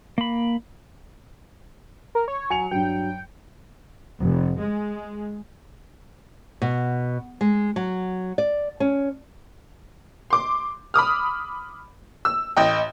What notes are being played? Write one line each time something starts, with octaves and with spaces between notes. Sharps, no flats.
A#3 B5
A#4
C#5
F#3 G#5 C#7 F7
G2 F#3 G5
F1
G#3
B2
G#3
F#3
D5
C#4
C6 D6
B5 D6 D#6 F6
E6
A1 D#5 G5